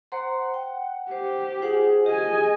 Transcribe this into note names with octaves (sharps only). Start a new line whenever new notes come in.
C5 F#5 A#5 C6
G5
G4 C5
F4 G#4 C5 F#5
F4 G4 D#5 G#5